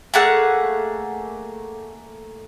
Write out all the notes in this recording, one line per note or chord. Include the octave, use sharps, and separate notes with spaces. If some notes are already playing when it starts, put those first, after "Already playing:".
A3 A#3 G#4 F#5